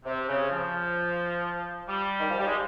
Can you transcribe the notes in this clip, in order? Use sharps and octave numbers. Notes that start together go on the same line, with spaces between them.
C3
C#3
F3
G3
D#3
F3
G3
G#3